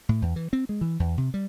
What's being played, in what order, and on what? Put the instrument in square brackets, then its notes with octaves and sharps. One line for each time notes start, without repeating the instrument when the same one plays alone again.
[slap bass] A2
E2
E3
C4
G#3
E3
E2
C3
G3